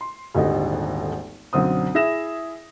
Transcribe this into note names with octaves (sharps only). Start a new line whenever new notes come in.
C6
D#1 G#1 D3 G4 A4 D#5
B1 F#2 D3 C4 D#6
E4 G#4 E5 A#6 E7